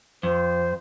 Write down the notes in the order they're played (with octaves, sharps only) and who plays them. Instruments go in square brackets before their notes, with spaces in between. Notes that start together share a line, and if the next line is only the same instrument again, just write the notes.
[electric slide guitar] F2 [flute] C5